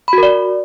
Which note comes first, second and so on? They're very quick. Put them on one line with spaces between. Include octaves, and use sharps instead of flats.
B5 F#4 A#4 D5